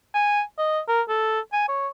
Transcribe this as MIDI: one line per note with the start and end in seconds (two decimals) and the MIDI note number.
0.15 0.42 80
0.58 0.80 75
0.88 1.02 70
1.09 1.40 69
1.53 1.68 80
1.68 1.88 73